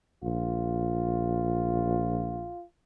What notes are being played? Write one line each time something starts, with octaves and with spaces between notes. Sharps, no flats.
A#1 F4